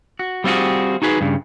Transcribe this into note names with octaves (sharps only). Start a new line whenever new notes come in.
F#4
G3 C4 F4 F#4 G#4
D#4 F#4 G#4 B4
G2 C#3